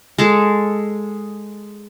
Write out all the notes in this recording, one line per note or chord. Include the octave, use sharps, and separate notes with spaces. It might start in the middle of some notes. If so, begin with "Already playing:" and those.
G#3 A4